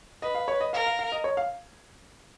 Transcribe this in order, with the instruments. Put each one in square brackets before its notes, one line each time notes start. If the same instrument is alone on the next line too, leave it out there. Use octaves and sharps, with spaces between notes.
[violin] B4 [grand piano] D#5
[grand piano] F5
C#5
D#5
[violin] A#4 [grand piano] F5
[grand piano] F5
F5
D#5
C#5
F5